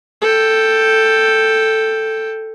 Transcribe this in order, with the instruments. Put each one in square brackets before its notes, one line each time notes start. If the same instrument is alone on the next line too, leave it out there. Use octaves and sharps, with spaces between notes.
[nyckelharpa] A4 G5